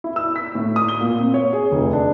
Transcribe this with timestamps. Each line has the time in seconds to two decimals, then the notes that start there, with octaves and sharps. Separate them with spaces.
0.04 E4
0.16 E6
0.36 B6
0.55 A2
0.76 D#6
0.88 G7
1.01 A#2
1.18 C4
1.34 C#5
1.53 G#4
1.72 F1
1.93 D4